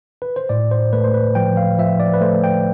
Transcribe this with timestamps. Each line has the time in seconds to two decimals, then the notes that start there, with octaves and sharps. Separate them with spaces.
0.22 B4
0.36 C5
0.49 A2 D5
0.71 C5
0.93 A3 B4
1.04 C5
1.14 B4
1.35 F3 G5
1.57 F5
1.78 F3 E5
2.00 D5
2.14 B4
2.21 A3 C5
2.44 G5